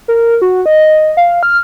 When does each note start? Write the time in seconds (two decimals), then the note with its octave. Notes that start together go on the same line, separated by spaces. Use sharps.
0.08 A#4
0.42 F#4
0.66 D#5
1.17 F5
1.43 F6